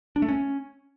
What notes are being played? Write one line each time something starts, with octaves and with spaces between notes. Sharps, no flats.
D4
A3
C#4